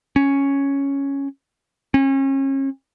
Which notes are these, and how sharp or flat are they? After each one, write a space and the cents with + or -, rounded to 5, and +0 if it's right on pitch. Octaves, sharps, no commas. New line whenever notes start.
C#4 +0
C#4 -35